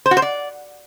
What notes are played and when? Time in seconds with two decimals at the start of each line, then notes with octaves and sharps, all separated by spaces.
0.06 C5
0.11 F#4
0.17 C5
0.22 D5